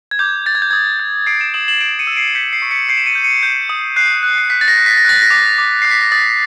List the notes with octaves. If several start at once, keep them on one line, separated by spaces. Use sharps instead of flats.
G#6
D6 G6
G6 A6
G#6
G6
D#6 G#6
G6
D#6 C7 D7
D7 E7
D#6 E7 F#7
E7 F#7
G6 D7 E7
C#7 D#7
E6
C7 D7
G6 B6 C#7
C7
C#6
B6 C#7
G6 C7 D7
E7
C#7 D#7
G6
C#7 D#7
G6
D#6
F#6 C7
F#6
C7
F#6 B6
A6
A#6
F#6
B6
A#6
F#6 A6
A#6
D6
D6
F#6 C7
B6
A#6
D#6 A6